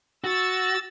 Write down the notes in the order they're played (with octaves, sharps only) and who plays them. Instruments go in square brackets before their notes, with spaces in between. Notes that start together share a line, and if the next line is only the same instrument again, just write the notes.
[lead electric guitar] F#4 [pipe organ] E6 A6